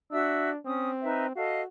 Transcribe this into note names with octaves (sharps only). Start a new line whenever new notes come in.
D4 F#4 E5 E6
C4 C#4 D#6
D#4 B4 E5
F#4 A4 D#5 F5